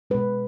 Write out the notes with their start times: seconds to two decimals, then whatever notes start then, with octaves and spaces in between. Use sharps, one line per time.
0.10 B2 G#3 B4